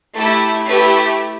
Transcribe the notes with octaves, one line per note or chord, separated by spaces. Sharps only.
A3 E4 G4 A4
A3 E4 G4 B4